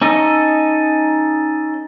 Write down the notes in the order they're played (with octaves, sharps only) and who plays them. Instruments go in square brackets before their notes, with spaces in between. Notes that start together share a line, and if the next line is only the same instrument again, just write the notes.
[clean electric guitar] C#4 D#4 A4 D#5